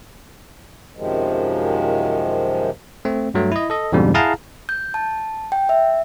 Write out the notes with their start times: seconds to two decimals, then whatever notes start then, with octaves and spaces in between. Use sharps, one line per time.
0.96 F#2 C3 D#3 F3 G#3
3.05 A3 C4
3.34 G2 F#3 A3
3.52 E4 D#5
3.70 A4 D#5
3.92 F2 G#2 B2 D3 G3
4.14 E4 G#4 F5 F#5 A5 A#5
4.69 G6
4.94 A5
5.52 G5
5.69 E5